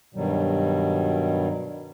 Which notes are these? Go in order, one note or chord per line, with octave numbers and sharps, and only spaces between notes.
G2 B2 D#3 F#3 G3